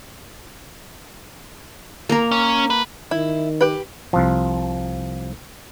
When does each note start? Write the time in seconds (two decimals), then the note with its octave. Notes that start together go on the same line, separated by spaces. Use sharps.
2.09 A#3 A#4
2.32 C#4
2.70 B4
3.11 D#3 E4
3.61 G4 B4
4.13 C2 F3